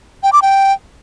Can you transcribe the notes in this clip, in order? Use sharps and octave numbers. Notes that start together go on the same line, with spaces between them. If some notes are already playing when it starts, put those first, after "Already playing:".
G5
D6
G5